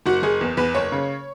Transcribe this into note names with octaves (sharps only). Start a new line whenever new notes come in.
F#1 F#4
F#1 G#4
E2
E2 B4
F#1 C#5
C#3